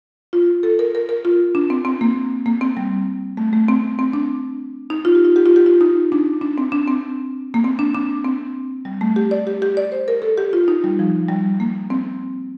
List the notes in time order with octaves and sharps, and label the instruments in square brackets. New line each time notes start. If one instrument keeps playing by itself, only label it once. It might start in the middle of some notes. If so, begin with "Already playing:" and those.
[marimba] F4
A4
A#4
A#4
A#4
F4
D4
C4
C4
A#3
A#3
C4
G3
A3
A3
C4
C4
D4
D#4
F4
G4
F4
G4
F4
G4
F4
D#4
D4
D4
C4
D4
C4
A#3
C4
D4
D4
C4
G3
A3
G4
D5
G4
G4
D5
C5
A#4
A4
G4
F4
D#4
G3
F3
G3
A#3
C4